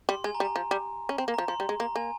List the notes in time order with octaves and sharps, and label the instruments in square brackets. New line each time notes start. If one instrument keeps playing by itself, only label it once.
[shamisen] G3 [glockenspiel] C6
[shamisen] G#3 [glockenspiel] G#5
[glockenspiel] A#5
[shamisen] G3
[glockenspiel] A#5
[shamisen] F3
G3
C#4
C4
A#3
[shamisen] F3 [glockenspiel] A#5
[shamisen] F3 [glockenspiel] C6
[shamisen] G3
G#3
[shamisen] A#3 [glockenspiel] A#5
[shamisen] A#3 [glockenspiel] G#5